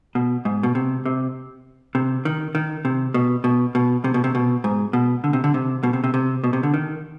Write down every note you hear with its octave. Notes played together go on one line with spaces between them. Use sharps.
B2
G#2
B2
C3
C3
C3
D#3
D#3
C3
B2
B2
B2
C3
B2
C3
B2
G#2
B2
D3
C3
D3
C3
B2
C3
C3
C3
B2
C3
D3
D#3